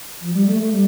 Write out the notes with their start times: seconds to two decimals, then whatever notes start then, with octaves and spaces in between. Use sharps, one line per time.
0.22 F3
0.34 G3
0.47 A3
0.59 A3
0.72 G3